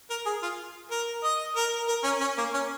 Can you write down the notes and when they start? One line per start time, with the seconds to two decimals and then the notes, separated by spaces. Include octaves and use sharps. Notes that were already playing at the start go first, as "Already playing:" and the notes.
0.10 A#4
0.26 G#4
0.43 F4
0.91 A#4
1.24 D#5
1.56 A#4
1.89 A#4
2.04 C#4
2.21 C#4
2.38 A#3
2.54 C#4